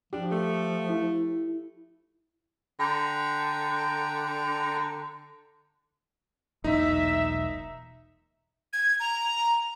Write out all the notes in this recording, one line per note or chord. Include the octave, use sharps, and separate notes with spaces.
F3 D4 G4
A3
E4
D3 G5 A#5
E1 B1 A#2 D#4 E5
G#6
A#5